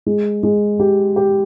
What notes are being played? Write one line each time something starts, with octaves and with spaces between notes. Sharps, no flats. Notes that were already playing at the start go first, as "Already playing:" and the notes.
G#3
G#3
G4
G4